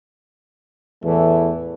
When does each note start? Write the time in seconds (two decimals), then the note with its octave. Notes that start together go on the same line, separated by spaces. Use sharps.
1.03 E2 A2 E3 A3